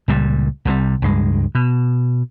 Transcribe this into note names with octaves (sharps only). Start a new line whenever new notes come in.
C#2 A#2 G3
C2 C3 F3 G3
C#2 G2 G#3
B2